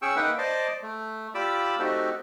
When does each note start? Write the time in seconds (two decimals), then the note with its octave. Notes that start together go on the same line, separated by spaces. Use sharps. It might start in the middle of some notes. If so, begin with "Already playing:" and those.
0.02 C#4 G#4 G5 C#6 E6
0.16 A#3 D#4 B4 E5 F#5 G5
0.38 C5 D5 D#5 A5 C6 D6
0.82 A3
1.35 F4 G4 D5 B5 D6 E6
1.79 A3 C4 D#4 F#4 G4 A4